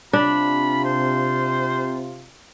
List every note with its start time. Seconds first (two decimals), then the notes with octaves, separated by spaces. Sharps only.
0.13 C3 D4 F4 B5
0.85 C5